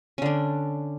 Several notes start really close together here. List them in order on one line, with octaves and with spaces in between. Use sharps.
C#4 D3 D4